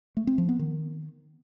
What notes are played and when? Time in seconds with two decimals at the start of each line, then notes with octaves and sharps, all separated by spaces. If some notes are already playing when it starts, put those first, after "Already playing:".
0.17 A3
0.27 C4
0.38 F3
0.49 B3
0.59 D#3